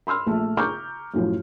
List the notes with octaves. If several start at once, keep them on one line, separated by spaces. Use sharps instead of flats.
B5 C6 E6 F6
A#1 A3 A5
A#5 C#6 D6 F6 G6
F#2 A2 F3